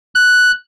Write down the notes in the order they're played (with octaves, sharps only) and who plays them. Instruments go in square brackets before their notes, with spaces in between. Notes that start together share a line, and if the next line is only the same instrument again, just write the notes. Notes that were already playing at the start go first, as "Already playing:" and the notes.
[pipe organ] F#6